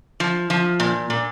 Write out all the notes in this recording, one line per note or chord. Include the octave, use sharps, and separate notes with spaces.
F3
F3
A#2
A#2